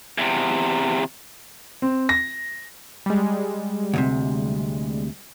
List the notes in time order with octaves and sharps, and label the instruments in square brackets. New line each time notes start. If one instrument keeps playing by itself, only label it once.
[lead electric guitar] E2 C3
[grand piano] C4
A#6
[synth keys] G3 G#3
[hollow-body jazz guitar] D2 A2 C3